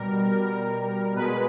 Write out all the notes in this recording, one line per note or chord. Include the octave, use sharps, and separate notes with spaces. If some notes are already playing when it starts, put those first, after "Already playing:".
Already playing: B2 G3 A#4
B2 G3
B2 G#3 B4